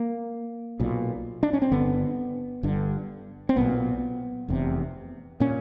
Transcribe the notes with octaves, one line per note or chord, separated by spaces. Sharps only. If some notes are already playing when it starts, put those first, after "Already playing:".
Already playing: A#3
B1 A#2
D4
C#4
C4
G1 G2 D3 B3
G1 G2 D3
C4
B1 A#2 B3
F1 E2 C3
A#2 C#4